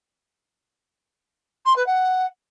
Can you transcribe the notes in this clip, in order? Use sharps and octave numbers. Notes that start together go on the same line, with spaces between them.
C6
B4
F#5